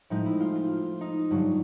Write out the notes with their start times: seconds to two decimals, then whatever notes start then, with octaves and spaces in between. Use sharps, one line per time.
0.10 A2 F3 G#3 D#4
0.26 E4
0.41 F4
0.55 F4
1.01 D#4
1.31 G2 D3 F#3